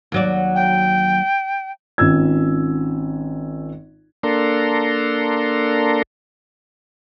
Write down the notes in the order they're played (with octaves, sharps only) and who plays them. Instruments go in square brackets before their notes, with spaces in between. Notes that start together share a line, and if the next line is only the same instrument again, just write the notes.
[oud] D#2 F#3 D5
[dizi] G5
[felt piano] G#1 C#4 F4 E6 G#6
[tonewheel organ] A#3 D4 A4 A#5 C6